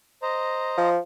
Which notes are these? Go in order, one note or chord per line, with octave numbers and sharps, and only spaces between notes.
C5 D#5 A#5
F3